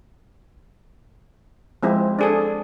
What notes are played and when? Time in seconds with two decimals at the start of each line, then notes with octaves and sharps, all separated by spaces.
1.83 F3 G#3 C4 E4
2.19 D4 G#4 A4